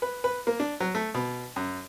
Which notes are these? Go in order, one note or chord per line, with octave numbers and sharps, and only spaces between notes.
B4
B4
A#3
D4
F#3
A3
B2
F#2